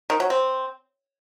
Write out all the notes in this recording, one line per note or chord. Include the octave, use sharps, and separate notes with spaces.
D#3
F#3
C4